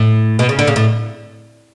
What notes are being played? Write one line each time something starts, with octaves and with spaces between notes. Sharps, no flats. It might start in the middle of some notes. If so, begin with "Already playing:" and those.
Already playing: A2
B2
C#3
D3
C#3
A2